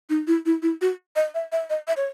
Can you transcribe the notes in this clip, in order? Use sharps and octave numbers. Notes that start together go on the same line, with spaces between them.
D#4
E4
E4
E4
F#4
D#5
E5
E5
D#5
E5
C#5